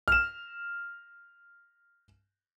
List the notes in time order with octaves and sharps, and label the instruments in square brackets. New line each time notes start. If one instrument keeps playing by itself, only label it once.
[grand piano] F6 E7